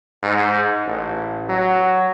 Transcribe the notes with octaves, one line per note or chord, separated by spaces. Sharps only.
G#2
A1
F#3